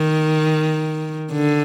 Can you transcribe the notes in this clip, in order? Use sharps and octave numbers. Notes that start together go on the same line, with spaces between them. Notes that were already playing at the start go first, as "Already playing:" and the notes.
Already playing: D#3
D3